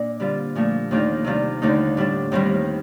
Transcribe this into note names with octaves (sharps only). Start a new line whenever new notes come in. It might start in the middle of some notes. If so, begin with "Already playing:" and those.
Already playing: A#2 D4
D3 G3 C4 F4
A#2 F3 A3
D#2 D#3 A3 D4 F4
C3 D#3 G3 D4 F4
D#2 D3 A3 D#4
A2 G3 D4
D#2 D#3 G3 C4 D#4